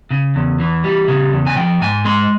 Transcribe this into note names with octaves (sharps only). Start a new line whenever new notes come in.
C#3
E2
E3
G3
C#3
E2
G#5
F3 G5
G#2 G#5
G#3 C6